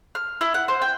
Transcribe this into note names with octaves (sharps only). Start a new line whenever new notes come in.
F6
E4
F#5
C5
G5